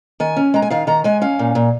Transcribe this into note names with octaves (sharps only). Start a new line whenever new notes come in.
D#3 G#5
C#4
G#3 A#5
G#5
D#3 F5
D#3 A#5
G#3 G#5
C#4 F5
A#2
A#2